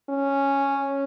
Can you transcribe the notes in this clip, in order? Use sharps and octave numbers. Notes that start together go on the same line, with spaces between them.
C#4